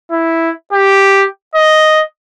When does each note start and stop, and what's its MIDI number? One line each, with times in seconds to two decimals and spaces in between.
0.11 0.51 64
0.73 1.25 67
1.55 2.03 75